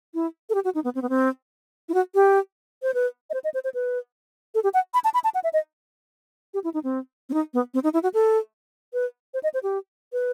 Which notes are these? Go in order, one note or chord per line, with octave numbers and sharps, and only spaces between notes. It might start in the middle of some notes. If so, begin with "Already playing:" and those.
E4
A4
G4
F#4
D#4
B3
C4
B3
C4
E4
F#4
G4
C5
B4
D#5
C5
D#5
C5
C5
B4
A4
G4
F#5
B5
A5
B5
A5
F#5
E5
D#5
G4
E4
D#4
C4
C4
D#4
B3
C4
D#4
E4
F#4
A4
B4
C5
D#5
C5
G4
B4